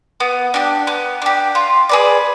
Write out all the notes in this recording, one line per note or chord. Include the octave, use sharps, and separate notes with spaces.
B3
D4 G4
B3
D4 G4
F4
G#4 B4 D5